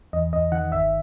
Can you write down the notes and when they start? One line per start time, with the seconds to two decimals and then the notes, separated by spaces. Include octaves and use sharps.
0.13 E2 D#5
0.33 E2 D#5
0.52 D#3 F#5
0.72 G1 E5